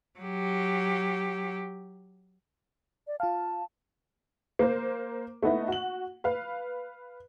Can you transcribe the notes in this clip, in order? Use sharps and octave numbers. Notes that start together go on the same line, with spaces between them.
F#3 G4
D5
F4 F5 A5
A#3 A#4 C5
A3 B3 D#4 E4
F#4 F#7
B4 F5